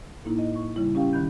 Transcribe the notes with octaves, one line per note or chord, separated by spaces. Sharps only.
A2 A#3 D#4 E4
D#5
C#6
C#3 G3 E4
C#4 G4 F5 G5 C#6
D2 D#3 B5 G6